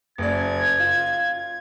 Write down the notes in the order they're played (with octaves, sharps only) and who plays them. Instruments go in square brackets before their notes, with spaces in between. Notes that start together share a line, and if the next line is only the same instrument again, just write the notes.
[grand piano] F#1 D5 [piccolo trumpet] G#6
[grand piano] F4